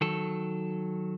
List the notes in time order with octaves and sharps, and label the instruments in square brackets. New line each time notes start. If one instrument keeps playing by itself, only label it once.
[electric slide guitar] D#3 F#3 A4